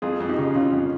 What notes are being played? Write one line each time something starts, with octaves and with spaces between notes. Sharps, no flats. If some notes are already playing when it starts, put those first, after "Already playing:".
F2 F4 G#4
F2
D#4 G4
C#3
C#3 C#4 F4
F2